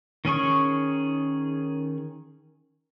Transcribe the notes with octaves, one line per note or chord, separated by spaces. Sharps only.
D#3 C#4 G#4 C#6